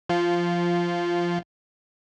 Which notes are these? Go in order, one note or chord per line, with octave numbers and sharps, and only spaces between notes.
F3 F4